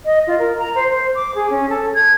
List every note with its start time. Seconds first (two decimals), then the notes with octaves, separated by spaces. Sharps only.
0.05 D#5
0.27 F4
0.38 A#4
0.59 A#5
0.75 C5
0.90 C5
1.15 D6
1.35 G#4
1.50 C#4
1.69 A4
1.94 G#6